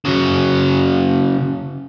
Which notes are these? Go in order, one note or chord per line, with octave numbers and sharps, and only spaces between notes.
C#3 F#3